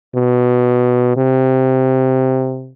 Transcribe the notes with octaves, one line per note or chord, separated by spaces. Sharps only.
B2
C3